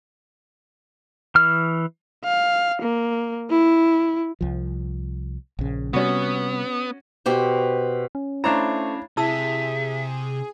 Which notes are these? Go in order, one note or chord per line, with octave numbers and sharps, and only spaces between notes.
E3 F6
F5
A#3
E4
C2 F3
A#1 C#3
C3 G3 B3 C#4 F#4
B2 G4 C5
C#4
A3 D4 E4 C5 C#5 F5 A#5 E7
C3 E4 G#4 E5 A5 E6